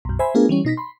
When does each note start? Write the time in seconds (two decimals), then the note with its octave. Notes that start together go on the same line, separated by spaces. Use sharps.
0.05 B1 F#2
0.19 C5 E5 G#5 B5
0.34 A3 B3 D4 F4 G#4 A#4
0.49 E3 G3 C#4
0.65 B2 D#4 A#6 B6
0.77 B5 C6